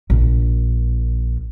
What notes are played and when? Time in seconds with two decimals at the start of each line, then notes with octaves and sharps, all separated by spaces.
0.10 A#1